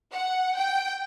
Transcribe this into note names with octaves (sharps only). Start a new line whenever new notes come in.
F#5
G5